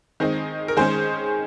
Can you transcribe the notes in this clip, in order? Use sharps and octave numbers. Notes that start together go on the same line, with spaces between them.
D#3 G#3 C4 D#4
A#4
D#3 G#3 C#4 G#4 C5